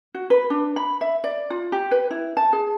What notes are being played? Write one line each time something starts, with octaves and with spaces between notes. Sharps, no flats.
F#4
B4
D4
B5
E5
D5
F4
G4
B4
E4
A5
G#4